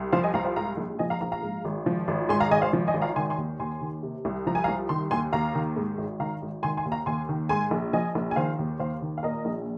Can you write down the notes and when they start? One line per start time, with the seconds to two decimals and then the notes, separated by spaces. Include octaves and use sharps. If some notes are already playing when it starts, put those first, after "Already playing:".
Already playing: C2
0.12 F3 C5 F5
0.24 D#5 G#5
0.34 C2 F5 A#5
0.45 C5 F5
0.56 G#2 F5 A#5
0.77 A#1
0.99 F3 D#5 G#5
1.10 F5 A#5
1.21 A#1 F5 A#5
1.32 F5 A#5
1.42 G#2
1.65 G#1
1.86 F3
2.08 G#1
2.29 G#2 G#5 C6
2.40 F5 A#5
2.51 G#1 D#5 G#5
2.62 C5 F5
2.73 F3
2.88 D#5 G#5
2.94 G#1
3.01 F5 A#5
3.16 D#3 G#5 C6
3.30 G#5 C6
3.38 D#2
3.59 D#2 G#5 C6
3.81 D#3
4.03 C3
4.25 C2
4.47 F3 A#5
4.55 G#5
4.64 F5 A#5
4.68 C2
4.89 D#3 C6
5.11 D#2 G#5 C6
5.33 D#2 F5 A#5
5.55 D#3
5.76 G#2
5.98 G#1
6.20 D#3 F5 A#5
6.42 G#1
6.63 D#3 G#5 C6
6.77 G#5 C6
6.85 D#2
6.92 F5 A#5
7.06 D#2 G#5 C6
7.29 D#3
7.49 G#2 G#5 C6
7.71 A#1
7.93 F3 D#5 G#5
8.15 A#1
8.31 G#5
8.36 D#3 C5 F5
8.59 D#2
8.79 D#2 C5 F5
9.02 D#3
9.18 F5
9.23 A#2 A#4 D#5
9.45 A#1